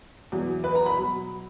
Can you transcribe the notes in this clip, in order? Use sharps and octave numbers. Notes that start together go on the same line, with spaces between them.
E2 B2 F#3
B4
A#5
B5
B2 F#3